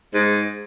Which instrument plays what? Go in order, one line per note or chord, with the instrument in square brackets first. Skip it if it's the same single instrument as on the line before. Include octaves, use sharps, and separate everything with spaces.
[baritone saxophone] G#2